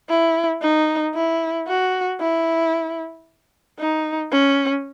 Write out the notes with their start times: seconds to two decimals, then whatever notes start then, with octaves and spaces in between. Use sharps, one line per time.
0.10 E4
0.62 D#4
1.15 E4
1.68 F#4
2.21 E4
3.79 D#4
4.32 C#4